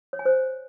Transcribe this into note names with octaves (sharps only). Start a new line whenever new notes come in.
C#5
G#5
C5